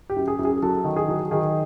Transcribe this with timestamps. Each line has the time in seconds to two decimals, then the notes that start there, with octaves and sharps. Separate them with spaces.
0.10 G4
0.16 F#2
0.28 G#4
0.39 F#2
0.45 G#4
0.62 F#3 A4
0.84 D#3
0.96 G#4
1.08 F#3
1.31 D#3 G#4